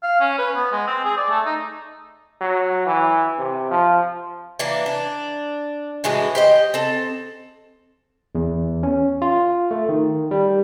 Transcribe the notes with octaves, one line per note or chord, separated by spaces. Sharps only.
F5
C#4
B4
B3
G#3
C4
G#4
D5
A3
D#4
F#3
E3
C3
F3
E3 A#3 D4
D4
A2 E3 G#3 F#4
G4 C5 D#5
C4 A4
E2
C#4
F4
A3
D#3
G3